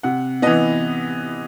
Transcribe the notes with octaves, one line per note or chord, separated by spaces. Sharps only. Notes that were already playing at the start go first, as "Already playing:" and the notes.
C3 F#5
E3 B3 D#5